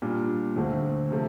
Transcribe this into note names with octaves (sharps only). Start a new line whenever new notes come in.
A#2 G3 D4 F4
D2 D3 A3 C4
C3 F3 A3